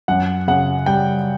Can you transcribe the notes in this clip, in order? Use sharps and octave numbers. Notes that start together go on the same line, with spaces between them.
F#2 F#5
C#3 F#5
G3 G5